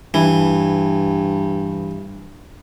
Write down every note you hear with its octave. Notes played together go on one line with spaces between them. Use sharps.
G2 E3